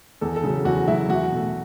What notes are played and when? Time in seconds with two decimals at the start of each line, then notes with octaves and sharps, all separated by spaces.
0.21 E2 A4
0.36 A4
0.43 C#3 F#3
0.65 E2 F#4
0.87 C#3 F#3 E4
1.09 E2 F#4
1.31 B2 A3